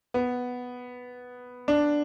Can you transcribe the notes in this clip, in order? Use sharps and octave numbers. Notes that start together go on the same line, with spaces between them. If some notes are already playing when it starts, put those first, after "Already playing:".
B3
D4